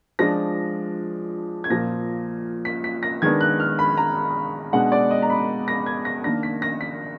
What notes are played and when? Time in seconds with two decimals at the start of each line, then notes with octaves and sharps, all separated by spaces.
0.19 F3 G#3 D4 A#6
1.64 G#6
1.70 A#2 F3 A#3 A#6
2.65 B6
2.84 B6
3.03 A#6
3.22 D#3 G#3 B3 D4 G#6
3.41 F#6
3.60 F6
3.79 B5
3.97 A#5
4.73 B2 G#3 D4 F#5
4.92 D5
5.11 D#5
5.22 A#5
5.30 B5
5.68 A#6
5.86 G#6
6.05 A#6
6.24 D#3 A#3 D4 A#6
6.43 B6
6.62 A#6
6.81 B6